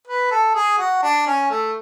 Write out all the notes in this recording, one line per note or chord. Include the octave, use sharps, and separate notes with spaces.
B4
A4
G#4
F#4
D4
C#4
A3